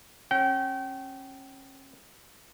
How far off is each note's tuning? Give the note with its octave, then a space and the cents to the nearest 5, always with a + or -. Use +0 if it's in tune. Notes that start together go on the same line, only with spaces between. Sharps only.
C#4 -35 G5 -35